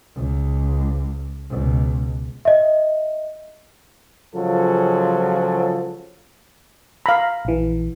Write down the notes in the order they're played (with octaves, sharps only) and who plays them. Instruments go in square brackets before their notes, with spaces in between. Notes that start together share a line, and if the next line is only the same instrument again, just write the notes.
[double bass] C#2
C#2 B2
[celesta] D#5 E5
[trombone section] C#3 F3 F#3 G#3 F4 A4
[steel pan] F5 B5 [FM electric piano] A#5
[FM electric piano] A#1 E3